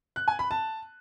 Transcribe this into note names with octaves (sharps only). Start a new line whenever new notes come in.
F#6
G#5
B5
A5